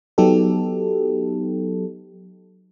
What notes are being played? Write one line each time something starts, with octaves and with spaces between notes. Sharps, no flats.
F#3 B3 D#4 G4 A4